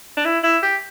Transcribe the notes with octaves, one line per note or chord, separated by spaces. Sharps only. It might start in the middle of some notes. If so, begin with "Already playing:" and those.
D4
E4
E4
G4